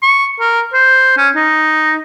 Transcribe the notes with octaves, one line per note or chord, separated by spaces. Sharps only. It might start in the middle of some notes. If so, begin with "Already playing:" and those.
C#6
A#4
C5
C#4
D#4